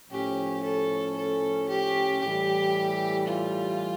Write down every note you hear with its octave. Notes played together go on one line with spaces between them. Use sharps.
A2 F3 C#4 G4
A4
A4
G4
A2 E3 G3 G4
F4